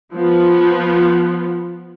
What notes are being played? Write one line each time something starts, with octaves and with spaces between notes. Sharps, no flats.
F3 B3